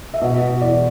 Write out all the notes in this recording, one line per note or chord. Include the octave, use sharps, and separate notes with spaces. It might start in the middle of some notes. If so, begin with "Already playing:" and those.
E5
B2 D#5
B2
E2 D5